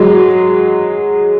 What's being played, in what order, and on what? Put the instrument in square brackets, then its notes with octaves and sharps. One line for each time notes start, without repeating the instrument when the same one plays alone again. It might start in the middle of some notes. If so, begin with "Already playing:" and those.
Already playing: [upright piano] F#3 G#3